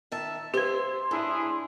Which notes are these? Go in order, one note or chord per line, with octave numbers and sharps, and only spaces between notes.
D#3 E5 A5
G4 B4 C5 E5 C6
A2 D4 E4 G#4